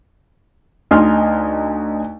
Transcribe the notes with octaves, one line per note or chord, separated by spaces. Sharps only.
D2 D#4 G#5 C6 F6